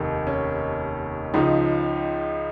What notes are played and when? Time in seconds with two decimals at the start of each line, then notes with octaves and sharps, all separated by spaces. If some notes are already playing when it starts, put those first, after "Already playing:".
Already playing: F1 D#2 D#3
0.27 C#4
1.34 C#2 C#3 F3 D#4